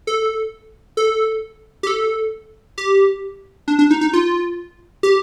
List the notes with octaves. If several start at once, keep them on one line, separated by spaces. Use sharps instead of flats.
A4
A4
G4
A4
G4
D4
D4
D#4
D#4
F4
G4